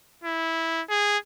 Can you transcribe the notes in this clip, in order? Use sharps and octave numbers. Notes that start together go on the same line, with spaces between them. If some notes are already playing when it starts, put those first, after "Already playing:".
E4
G#4